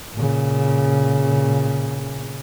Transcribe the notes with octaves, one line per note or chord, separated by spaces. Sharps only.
A#2 C#3